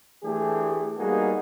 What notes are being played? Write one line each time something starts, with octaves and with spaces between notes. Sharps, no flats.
E3 A3 D4 G4 G#4
G3 A#3 B3 D#4 F#4 G#4